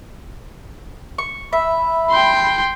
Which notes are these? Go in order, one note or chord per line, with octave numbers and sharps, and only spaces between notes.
C#6
E5 B5
G5 C6